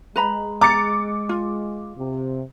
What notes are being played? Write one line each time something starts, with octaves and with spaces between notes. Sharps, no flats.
G#3 B4 A#5 B5
A#5 D6 A6 C#7
F4
C3